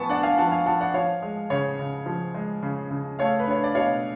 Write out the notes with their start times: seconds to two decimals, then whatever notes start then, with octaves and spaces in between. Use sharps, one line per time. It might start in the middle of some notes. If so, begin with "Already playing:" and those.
Already playing: F3 B3 G#5 A5 C#6
0.09 D4 D5 F#5
0.23 F5 G#5
0.37 F3 F#5 A5
0.52 F5 G#5
0.66 F3 F#5 A5
0.81 D5 F#5
0.94 F3 C#5 F5
1.22 G#3
1.50 C#3 C#5
1.79 C#3
2.06 F3
2.34 G#3
2.63 C#3
2.91 C#3
3.19 A3 C#5 F5
3.40 B4
3.47 D4 C#5
3.64 D5
3.75 B2 C#5 F5